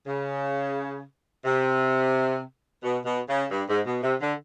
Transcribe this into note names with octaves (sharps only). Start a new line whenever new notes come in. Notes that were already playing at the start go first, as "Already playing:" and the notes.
C#3
C3
B2
B2
C#3
G2
G#2
B2
C3
D3